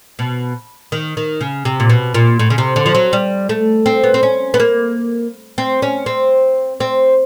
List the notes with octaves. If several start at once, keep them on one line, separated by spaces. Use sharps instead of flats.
B2
D#3
D#3
C#3
C3
A#2
B2
A#2
A2
C#3
C3
D3
F3
F#3
G3
A3
C4
B3
C4
C#4
B3
A#3
C4
C#4
C4
C4